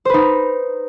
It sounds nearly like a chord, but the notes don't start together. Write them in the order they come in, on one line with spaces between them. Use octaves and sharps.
C5 B4 D#4